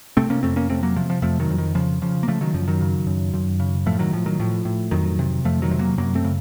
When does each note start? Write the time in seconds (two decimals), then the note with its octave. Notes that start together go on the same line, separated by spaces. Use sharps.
0.17 C3 A3 C4
0.30 A#3 C#4
0.43 F2 A3 C4
0.56 A#3 C#4
0.70 C3 A3 C4
0.83 F#3 A#3
0.96 C3 F3
1.10 F3
1.22 F2 F3 A3
1.40 D#3 F#3
1.49 F2
1.58 D#3
1.75 C#3 F3
2.02 C#3 F3
2.23 A#3
2.28 C#3 F3 A3
2.41 D#3 F#3
2.54 F#2 F3
2.68 D#3 F#3
2.81 C#3
3.07 F#2
3.33 F#2
3.60 C#3
3.86 A2 F3 A3
3.99 D#3 F#3
4.13 A2 F3
4.26 D#3 F#3
4.40 A2 F3
4.65 A2
4.91 F2 D#3 F#3
5.19 C3
5.45 F2 F3 A3
5.62 D#3 F#3
5.71 C3
5.79 F#3 A#3
5.98 F#2 F#3 A#3
6.15 A3 C4
6.24 C#3